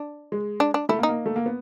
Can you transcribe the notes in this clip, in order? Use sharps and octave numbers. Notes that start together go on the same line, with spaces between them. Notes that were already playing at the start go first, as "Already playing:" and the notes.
Already playing: D4
G#3
D4
D4
A3 E4
A#3
D#4
A#3
A3
A#3
B3